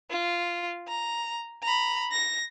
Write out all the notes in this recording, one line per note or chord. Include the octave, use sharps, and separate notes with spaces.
F4
A#5
A#5 B5
A#6